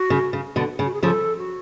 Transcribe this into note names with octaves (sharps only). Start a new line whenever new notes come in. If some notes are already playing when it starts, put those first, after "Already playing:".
Already playing: F#4
C#3
C#3
B2 D3
C#3
F#4
G#4
C#3 F3 A4
F#4